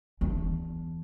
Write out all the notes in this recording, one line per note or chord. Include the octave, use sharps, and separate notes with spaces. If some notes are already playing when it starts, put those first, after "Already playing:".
E2 D4